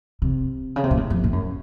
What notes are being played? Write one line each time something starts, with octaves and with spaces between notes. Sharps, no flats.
C3
C#3
C3
A#2
A2
F2
A2
F#2